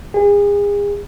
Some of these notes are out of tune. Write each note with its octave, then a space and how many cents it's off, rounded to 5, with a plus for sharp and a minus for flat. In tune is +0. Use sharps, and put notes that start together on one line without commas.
G#4 -35